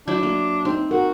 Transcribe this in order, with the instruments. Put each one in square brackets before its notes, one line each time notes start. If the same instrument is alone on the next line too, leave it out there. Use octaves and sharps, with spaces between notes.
[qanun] F#3 E4 [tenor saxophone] D4
[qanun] A#3
[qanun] C4 [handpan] D#4
[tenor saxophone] F#4 [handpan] A#4